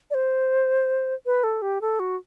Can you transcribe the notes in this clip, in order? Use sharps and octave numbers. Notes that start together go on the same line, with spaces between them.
D5
C5
B4
A4
G4
A4
F#4